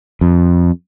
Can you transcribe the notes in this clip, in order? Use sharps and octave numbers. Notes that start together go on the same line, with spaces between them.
F2